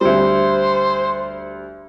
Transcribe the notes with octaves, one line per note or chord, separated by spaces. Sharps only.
D2 G3 C5